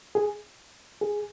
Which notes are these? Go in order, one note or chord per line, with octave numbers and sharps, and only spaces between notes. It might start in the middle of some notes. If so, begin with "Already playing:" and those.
G#4
G#4